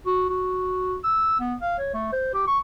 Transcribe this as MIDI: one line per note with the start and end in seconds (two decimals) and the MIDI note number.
0.06 0.27 66
0.30 0.96 66
1.04 1.39 88
1.40 1.55 59
1.62 1.78 77
1.79 1.90 73
1.94 2.12 57
2.13 2.32 72
2.34 2.47 67
2.47 2.59 85